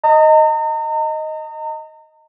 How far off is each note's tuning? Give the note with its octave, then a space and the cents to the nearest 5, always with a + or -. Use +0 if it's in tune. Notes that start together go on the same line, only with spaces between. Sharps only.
D#5 +0 A#5 -40